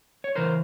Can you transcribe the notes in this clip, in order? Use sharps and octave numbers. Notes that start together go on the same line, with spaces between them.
C#5
C#3 E3 A#4 C5